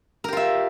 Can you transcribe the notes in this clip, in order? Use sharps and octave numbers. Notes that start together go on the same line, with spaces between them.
F4 G4 A#4 E5